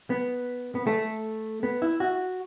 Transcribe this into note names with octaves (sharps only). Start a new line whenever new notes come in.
B3
B3
A3
B3
E4
F#4